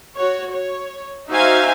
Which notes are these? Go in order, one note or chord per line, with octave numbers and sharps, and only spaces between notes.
F#4 C#5
C#5
D#4 F#4 C5 E5 F5 G#5